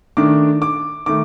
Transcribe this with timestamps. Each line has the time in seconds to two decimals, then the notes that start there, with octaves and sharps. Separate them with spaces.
0.17 D#3 A3 D4 D6
0.62 D6
1.06 D#3 A3 D6